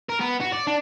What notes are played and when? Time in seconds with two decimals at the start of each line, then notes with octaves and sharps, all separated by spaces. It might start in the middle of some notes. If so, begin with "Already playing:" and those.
0.09 A#4
0.20 B3
0.40 F#4
0.52 D5
0.67 D4